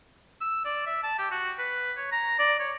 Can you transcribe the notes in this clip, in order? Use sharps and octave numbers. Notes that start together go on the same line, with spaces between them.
E6
D5
E5
A5
G4
F#4
B4
C#5
A#5
D5
C#5